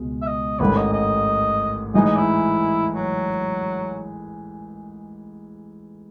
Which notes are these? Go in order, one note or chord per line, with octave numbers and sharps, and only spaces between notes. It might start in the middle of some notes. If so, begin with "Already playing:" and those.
Already playing: C#2 B2 G#3
E5
D#5
A1 G#2 D#3 A3 B4
D#5
D#5
A2 E3 G#3 D#4 D#5
D#5
E4
F#3